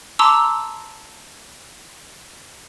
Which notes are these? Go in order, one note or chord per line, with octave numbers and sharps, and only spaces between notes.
A5 A#5 C6 D6 E6